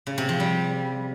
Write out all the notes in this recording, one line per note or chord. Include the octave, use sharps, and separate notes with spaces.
C#3
C3
F3
G3